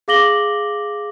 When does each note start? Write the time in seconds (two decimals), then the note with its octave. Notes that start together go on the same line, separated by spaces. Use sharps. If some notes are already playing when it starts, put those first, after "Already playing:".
0.08 G#4 F5 D6 A#6 F#7 G7